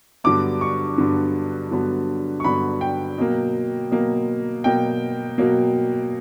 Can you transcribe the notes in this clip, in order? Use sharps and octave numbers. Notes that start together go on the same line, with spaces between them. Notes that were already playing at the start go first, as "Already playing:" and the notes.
G2 D3 F#3 B3 D6
C#6
G2 D3 F#3 B3
G2 D3 F#3 B3
C#6
G2 D3 F#3 B3 B5
G5
B2 F#3 A#3
B2 F#3 A#3
B2 F#3 A#3 G5
B2 F#3 A#3